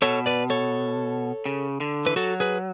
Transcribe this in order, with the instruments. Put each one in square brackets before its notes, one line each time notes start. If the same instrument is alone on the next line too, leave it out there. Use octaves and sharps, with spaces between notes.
[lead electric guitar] B2 [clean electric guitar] A4 C#5
[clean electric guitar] B4 D5
A4 C#5
[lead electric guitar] C#3
D3
[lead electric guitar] E3 [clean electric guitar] B4
[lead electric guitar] F#3 [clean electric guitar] F#4 A4
[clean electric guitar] G#4 B4